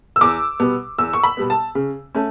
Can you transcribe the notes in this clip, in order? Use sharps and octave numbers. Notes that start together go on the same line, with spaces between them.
E6
E2 D6
B2 G3 B3
E2 E6
C#6
B5
B2 G3 B3
A5
C#3
A3 C#4